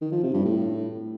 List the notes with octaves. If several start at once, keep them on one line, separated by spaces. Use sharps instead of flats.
D#3
F3
C3
G2
A2